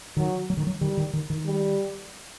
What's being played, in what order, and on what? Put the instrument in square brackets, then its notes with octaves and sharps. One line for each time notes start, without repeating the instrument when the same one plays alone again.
[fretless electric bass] D#3 [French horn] F#3
[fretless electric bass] F#3
D#3
F#3
[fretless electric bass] D#3 [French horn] G3
[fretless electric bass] D#3
D#3
D#3
[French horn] G3